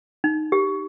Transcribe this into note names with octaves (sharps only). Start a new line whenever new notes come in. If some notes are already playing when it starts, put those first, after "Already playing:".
D#4
G4